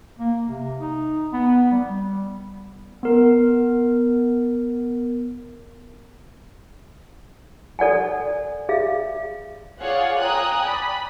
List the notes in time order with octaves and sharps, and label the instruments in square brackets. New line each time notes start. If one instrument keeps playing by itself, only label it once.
[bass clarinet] A#3
C3
D#4
B3
G3
[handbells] B3 A#4
[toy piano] A4 D5 F#5 G#5
G#4 E5 F5
[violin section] F4 G#4 C#5 D5 F5 F#5
G5 G#5 A#5 D#6 F#6
D5 B5